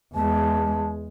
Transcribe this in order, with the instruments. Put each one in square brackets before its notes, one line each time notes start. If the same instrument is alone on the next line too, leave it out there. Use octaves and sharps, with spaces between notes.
[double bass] E2 G#3 [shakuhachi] A5